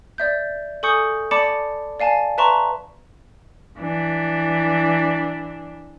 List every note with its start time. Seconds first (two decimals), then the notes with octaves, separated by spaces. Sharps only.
0.18 D5 E5 G6
0.83 A4 G#5 C#6 D#6 G6 C#7
1.31 D5 A5 B5 D6 C#7
2.00 D5 F5 G#5 A5
2.38 B4 E5 A5 A#5 C6 C#6
3.79 E3 D4